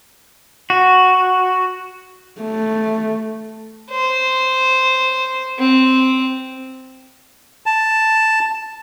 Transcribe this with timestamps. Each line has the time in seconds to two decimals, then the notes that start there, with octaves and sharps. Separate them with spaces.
0.70 F#4
2.41 A3
3.91 C5
5.59 C4
7.66 A5